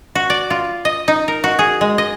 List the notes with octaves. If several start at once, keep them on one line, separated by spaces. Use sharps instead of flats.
F#4
D5
F4
D#5
D#4
A#4
F#4
G#4
G#3
D#5